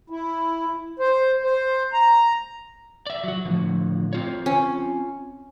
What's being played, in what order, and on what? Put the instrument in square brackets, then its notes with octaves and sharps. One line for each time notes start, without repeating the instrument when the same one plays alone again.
[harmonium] E4
C5
C5
A#5
[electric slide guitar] D5 E5
F#3 F#4
A2 D3 F3
C4 F4 C#5
[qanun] C#4